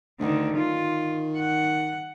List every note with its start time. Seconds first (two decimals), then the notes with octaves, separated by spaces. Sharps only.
0.20 D2 D3 D#3
0.56 D#3 F4
1.38 F#5